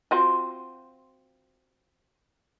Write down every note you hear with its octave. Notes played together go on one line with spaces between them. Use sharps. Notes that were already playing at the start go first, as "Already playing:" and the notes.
C4 F4 F#4